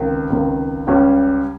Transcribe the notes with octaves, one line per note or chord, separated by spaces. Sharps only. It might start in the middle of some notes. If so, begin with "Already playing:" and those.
Already playing: C#2 C3 D#3
C#2 C3 D#3
C#2 C#3 G3 C#4 G4